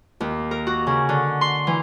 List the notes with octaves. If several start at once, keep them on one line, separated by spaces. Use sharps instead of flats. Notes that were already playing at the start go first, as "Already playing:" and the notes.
D#2
A#4
F#4
C#3
D3
C6
E3